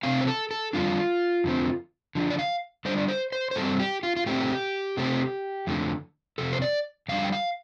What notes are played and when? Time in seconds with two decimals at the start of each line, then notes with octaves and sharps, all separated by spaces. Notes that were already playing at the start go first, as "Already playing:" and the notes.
0.03 C3 A3 C4 F5
0.21 C5
0.27 A4
0.51 A4
0.73 F2 D3 G3 D4 F4
1.44 F2 D3 A3 C4
2.15 D3 F3 D4
2.30 D5
2.39 F5
2.85 D3 G3 D4 C5
2.98 D5
3.08 C5
3.32 C5
3.51 C5
3.55 G2 G3 C4 A4
3.80 G4
4.03 F4
4.16 F4
4.26 A2 A3 C4 G4
4.97 C3 A3 C4
5.67 F2 D3 A3
6.38 F2 C3 A4
6.53 C5
6.62 D5
7.08 F2 D3 G3 D4 F5
7.24 G5
7.32 F5